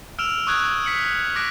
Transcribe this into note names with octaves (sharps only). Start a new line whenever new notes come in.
E6 F6 D7 E7 F7
C#6 D#6 F#6 G#6 D7
B6 C#7 F#7
D6 F#6 A#6 B6 D7